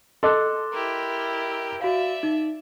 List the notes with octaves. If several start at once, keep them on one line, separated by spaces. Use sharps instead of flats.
A4 D#5 C6 D6 F#6
E4 G4 A#4
F#4 D5 E5 F5
D#4